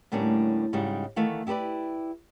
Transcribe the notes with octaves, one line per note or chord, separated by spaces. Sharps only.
D2 A2 G3 A#3 C#4 D4
G#2 C#3 G3 D#4 F#4
D#3 E3 A3 F5 F#5
E4 G4 A4 B4 D5